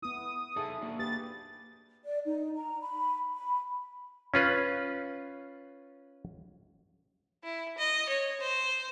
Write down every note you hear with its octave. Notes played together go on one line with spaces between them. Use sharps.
B3 E4 D#6
D#4 G#4 A4 E5 A5
A#3 D4 F#4
G4 B4 A6
D5
D#4
A#5
B5
B5
C#4 F4 B4
E4
D#5
C#5
C5